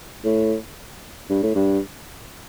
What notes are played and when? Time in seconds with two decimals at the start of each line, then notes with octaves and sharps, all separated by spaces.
0.24 A2
1.30 G2
1.43 A2
1.55 G2